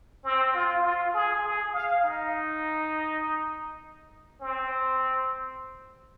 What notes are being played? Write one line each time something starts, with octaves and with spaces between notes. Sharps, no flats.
C4
F4
F4
G#4
G#4
F5
D#4
C4